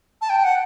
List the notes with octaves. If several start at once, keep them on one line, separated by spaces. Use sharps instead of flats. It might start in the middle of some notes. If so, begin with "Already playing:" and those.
A5
G5
F#5